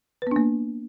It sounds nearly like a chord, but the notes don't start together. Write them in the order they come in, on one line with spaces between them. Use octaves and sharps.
B4 B3 D4 A#3